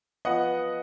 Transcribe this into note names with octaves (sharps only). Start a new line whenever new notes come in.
F3 B3 D#5 F#5